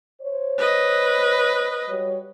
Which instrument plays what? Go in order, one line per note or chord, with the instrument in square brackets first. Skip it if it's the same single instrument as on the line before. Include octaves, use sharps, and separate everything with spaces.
[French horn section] C5 C#5
[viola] B4 D#5
[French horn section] G3 F#4 C#5